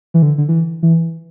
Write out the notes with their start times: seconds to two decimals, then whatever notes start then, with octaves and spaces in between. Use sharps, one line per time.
0.14 E3
0.22 D3
0.38 D3
0.49 E3
0.83 E3